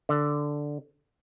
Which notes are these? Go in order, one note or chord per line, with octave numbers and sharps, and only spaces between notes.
D3